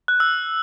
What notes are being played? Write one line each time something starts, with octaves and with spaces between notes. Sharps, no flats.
F#6
E6